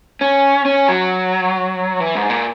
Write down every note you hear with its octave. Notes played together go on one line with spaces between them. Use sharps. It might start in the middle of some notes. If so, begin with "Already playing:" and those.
C#4
C#4
F#3
E3
G#2
A#2